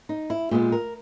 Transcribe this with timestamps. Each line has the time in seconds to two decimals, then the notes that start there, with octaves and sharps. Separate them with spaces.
0.09 D#4
0.30 E4
0.51 A#2 G#3 B3 G4
0.72 A#4